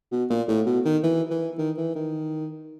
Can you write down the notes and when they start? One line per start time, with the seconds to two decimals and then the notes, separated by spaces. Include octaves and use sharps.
0.12 B2
0.30 A#2
0.48 A2
0.67 B2
0.85 D#3
1.03 E3
1.30 E3
1.58 D#3
1.77 E3
1.96 D#3